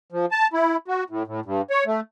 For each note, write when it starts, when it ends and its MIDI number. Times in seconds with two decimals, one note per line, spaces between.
0.12 0.26 53
0.31 0.47 81
0.53 0.76 64
0.88 1.04 66
1.10 1.23 45
1.27 1.40 45
1.45 1.62 43
1.70 1.84 73
1.86 2.00 57